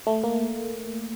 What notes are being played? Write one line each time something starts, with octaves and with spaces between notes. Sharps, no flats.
A3
A#3